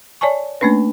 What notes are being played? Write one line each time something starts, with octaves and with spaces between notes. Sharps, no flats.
C#5 D5 G#5 A5 C#6
A3 A#3 C#4 D4 B4